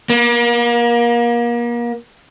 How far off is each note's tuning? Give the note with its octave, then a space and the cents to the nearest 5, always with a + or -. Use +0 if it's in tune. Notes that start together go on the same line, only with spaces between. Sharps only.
A#3 +30